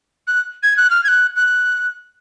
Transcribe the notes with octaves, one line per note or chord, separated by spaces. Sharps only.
F#6
G#6
F#6
F6
G#6
F#6
F#6